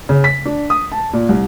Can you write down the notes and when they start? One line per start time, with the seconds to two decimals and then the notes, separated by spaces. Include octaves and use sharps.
0.09 C#3
0.24 B6
0.45 D4
0.70 D#6
0.92 A5
1.13 A#2
1.29 C2